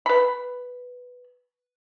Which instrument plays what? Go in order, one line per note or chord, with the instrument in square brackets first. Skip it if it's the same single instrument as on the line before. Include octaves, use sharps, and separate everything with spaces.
[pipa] B4 B5